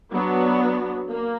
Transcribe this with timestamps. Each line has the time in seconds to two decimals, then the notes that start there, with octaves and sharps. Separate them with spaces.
0.11 F#3 B3 D4 F#4
1.09 A#3